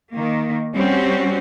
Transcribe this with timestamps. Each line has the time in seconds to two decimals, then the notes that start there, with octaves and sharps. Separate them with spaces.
0.13 D#3 A#3
0.74 G3 C4 C#4 F#4